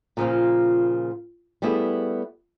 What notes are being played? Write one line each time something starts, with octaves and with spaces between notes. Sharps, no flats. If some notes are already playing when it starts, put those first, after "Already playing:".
A#2 C#3 F3 A3 A#3 F4
G3 A3 B3 E4 G#4